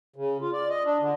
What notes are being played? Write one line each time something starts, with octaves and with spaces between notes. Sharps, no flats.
C#3
F4
D5
D#5
D4
D3